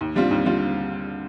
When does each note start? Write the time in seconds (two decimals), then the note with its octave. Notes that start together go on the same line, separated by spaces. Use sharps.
0.01 D#2
0.15 D3 G3 C4 F4
0.31 D#2
0.45 D3 G3 C4 F4